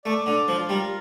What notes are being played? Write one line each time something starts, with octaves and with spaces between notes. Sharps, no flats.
A3 D5
D3 D4
F3 F4
G3 A#4